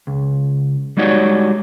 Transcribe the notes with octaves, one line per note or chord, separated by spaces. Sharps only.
C#2
G3 G#3 D#4 F#4 C#5 D5